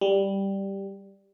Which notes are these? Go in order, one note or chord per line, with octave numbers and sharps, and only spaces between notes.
G3